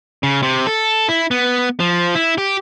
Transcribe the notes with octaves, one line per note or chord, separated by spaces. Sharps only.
C#3
C3
A4
E4
B3
F3
E4
G4